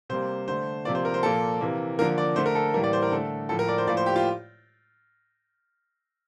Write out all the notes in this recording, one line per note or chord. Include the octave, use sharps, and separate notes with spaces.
C3 G3 A#3 C5
D3 A3 C5
C3 F3 A#3 D5
C5
A#4
C5
A#2 F3 A#3 A4
C3 E3 A#3
D3 F3 A#3 A#4
D5
D3 A3 C5
A#4
A4
A2 E3 G3 A#3 A#4
D5
C5
A#4
D3 A3 A4
A2 F3 A#3 A4
A#4
D5
C5
A2 F3 A#3 D5
C5
G4
F4